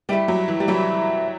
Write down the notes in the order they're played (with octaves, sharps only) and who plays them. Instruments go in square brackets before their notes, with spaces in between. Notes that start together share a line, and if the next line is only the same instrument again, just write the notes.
[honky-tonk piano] G3 [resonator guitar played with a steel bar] A3 E4 G4
[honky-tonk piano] F#3
E3
G3
[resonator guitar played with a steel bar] C3 E3 A3 E4 [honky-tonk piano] F#3